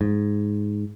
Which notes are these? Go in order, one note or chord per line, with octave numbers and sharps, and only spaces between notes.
G#2